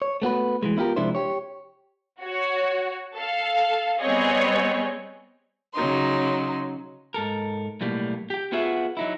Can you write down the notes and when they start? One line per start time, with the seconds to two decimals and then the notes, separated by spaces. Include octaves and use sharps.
0.02 C#5
0.22 A3 B3 F#4 B4
0.63 E3 F3 G#3
0.77 B3 E4 F4 G4 A#4
0.96 C3 F3 G#3 D4 E4 C5
1.15 G4 C#5
2.21 F#4 C#5
3.17 A4 F5
4.02 G3 B3 C4 G#4 C#5 D#5
5.73 C#3 F#3 D#4 C6
7.14 G#2 A4 A#4
7.81 B1 A2 G3 A#3
8.30 G4 G5
8.52 B3 F4 F#4 G#4 E5
8.97 F#3 D#4 E4